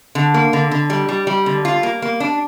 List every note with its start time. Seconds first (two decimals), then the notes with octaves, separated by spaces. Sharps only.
0.15 D3
0.34 A#3
0.53 D3
0.71 D3
0.90 G3
1.09 G3
1.27 G3
1.46 D3
1.65 F4
1.83 A#3
2.02 A#3
2.20 D4